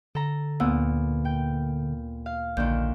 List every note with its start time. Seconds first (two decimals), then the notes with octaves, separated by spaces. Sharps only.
0.15 D3 A4 A#5
0.60 D2 A#2 B3 E6
1.25 G5
2.26 F5
2.57 A#1 A#2 D3 D#3 G6